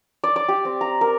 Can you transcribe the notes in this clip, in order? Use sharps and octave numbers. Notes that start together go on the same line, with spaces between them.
D5
D5
G4
C4
A#5
A#4